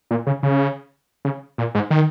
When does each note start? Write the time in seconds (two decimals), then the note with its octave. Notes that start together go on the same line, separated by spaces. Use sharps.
0.11 A#2
0.27 C#3
0.43 C#3
1.25 C#3
1.58 A#2
1.75 G#2
1.91 D#3